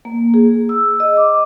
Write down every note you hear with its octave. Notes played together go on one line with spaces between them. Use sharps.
A#3
G#4
E6
D#5
D6